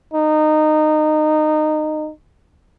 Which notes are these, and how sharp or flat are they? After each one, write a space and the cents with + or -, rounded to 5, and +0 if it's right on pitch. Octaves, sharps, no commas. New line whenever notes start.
D#4 -20